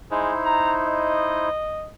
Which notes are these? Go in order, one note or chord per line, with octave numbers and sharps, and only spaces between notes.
G#3 D#4 E4 C5
A#5
D#5